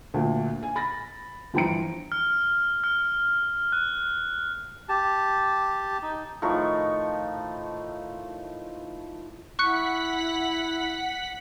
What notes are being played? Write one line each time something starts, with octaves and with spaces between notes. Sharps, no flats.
D2 A#2
G#5
B5 A6 A#6
G1 E3 F3 G5 A#5 D7
F6
F6
F#6
G4 A5
D#4
A2 D#3 F3 C#6
E4 F#5 C#6 F#6 B6 C#7